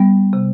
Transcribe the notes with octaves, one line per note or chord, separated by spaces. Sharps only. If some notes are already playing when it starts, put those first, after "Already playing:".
Already playing: G3 B3
C3